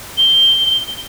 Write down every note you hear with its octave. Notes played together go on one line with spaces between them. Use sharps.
G7